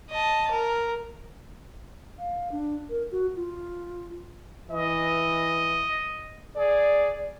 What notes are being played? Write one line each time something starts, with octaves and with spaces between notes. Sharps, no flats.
D#5 A5
A#4
F5
D4
A#4
F#4
F4
E3 D#5
G#4 D5